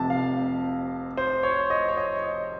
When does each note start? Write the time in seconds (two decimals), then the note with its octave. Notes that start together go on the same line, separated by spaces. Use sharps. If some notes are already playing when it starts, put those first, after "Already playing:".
Already playing: F1 F2 C3 A5
0.10 F5
1.17 C5
1.43 C#5
1.70 D#5
1.88 C#5
1.97 D#5